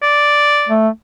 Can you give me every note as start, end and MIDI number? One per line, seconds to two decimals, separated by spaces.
0.03 0.74 74
0.69 0.88 57